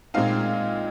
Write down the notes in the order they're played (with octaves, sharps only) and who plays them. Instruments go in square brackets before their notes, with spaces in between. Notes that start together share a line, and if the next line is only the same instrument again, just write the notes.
[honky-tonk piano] A#2 G#3 C4 D#4 F5